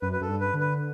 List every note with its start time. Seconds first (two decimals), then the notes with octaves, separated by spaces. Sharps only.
0.02 F#2 B4
0.12 B4
0.21 F#2 A4
0.28 G2
0.40 B4
0.54 D3
0.60 B4